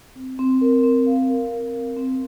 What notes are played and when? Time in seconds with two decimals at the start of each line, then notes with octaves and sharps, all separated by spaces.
0.16 C4
0.39 C4
0.61 A#4
0.84 C4
1.06 F5
1.29 A#4
1.51 A#4
1.74 C4
1.97 C4